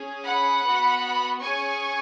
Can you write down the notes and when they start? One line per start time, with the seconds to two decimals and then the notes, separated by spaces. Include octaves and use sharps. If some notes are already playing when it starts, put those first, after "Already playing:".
Already playing: C#4 G#4
0.24 F#5 B5
0.63 B3 F#4
1.39 C#4 G#4 G#5 C#6